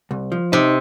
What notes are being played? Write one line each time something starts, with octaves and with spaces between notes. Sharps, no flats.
C2
F3
C3 D#4